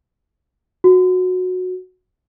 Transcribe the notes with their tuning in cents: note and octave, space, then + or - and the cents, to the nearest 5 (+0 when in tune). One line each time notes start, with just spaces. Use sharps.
F#4 -15